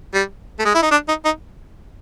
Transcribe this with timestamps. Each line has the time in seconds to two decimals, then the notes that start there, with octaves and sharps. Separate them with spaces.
0.14 G3
0.59 A3
0.65 G#3
0.75 E4
0.83 D#4
0.91 D4
1.08 D#4
1.25 D#4